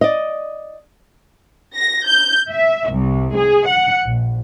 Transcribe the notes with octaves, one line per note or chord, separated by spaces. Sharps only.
D5 D#5
A#6
G6
E5
C2
G#4
F#5
A#1